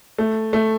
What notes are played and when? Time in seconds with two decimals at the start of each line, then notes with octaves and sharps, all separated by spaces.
0.18 A3
0.53 A3